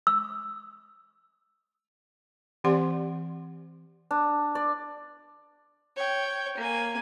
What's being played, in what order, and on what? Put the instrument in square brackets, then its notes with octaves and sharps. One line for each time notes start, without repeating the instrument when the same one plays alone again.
[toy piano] E6
[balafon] E3 C4 G4 D5 F#5 C6
[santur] D4
D5
[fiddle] C#5 G5
A#3 G#5